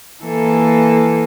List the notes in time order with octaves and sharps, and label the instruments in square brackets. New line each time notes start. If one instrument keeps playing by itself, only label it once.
[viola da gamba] E3 A#3 A4